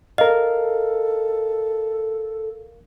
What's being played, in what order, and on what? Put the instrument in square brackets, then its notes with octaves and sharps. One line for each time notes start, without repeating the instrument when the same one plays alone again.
[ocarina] A4 [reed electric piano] A#4 F5 [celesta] D#5